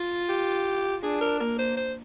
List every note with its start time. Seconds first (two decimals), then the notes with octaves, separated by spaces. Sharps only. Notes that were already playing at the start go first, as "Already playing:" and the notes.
Already playing: F4
0.29 G4
1.02 D4 G#4
1.21 A#4
1.39 A#3 A#4
1.58 C5
1.76 C5